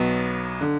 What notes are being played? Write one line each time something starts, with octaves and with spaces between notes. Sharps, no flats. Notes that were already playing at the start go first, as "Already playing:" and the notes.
Already playing: B1 F#3 B3
D3